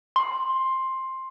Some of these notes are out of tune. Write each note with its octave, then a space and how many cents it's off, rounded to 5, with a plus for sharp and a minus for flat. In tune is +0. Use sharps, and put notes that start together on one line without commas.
C6 +10